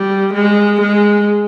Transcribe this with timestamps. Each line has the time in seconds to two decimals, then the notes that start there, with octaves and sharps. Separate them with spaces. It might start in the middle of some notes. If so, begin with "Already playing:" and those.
Already playing: G3
0.34 G#3
0.81 G#3